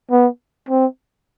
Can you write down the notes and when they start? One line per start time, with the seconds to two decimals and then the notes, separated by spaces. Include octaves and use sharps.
0.11 B3
0.69 C4